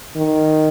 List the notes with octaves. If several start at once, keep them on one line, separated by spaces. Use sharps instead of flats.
D#3